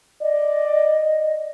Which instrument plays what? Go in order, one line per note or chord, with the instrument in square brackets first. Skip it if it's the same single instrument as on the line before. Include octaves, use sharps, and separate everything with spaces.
[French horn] D5 [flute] D#5